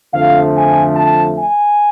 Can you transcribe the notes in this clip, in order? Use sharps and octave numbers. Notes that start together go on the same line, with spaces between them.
F2 D3 F3 A3 F5
G#5
A5
G#5